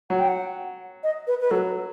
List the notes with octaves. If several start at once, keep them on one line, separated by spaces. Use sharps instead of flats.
F#3 F#5
G5
F#5
D#5
B4
B4
F#3 A4